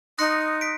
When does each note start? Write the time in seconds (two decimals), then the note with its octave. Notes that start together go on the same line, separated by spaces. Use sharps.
0.18 D#4 C6 D#6 F#6 A#6 C#7
0.61 B6 D7